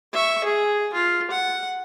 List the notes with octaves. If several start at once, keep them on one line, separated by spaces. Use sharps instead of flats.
E5 C#6
G#4
F4
F#5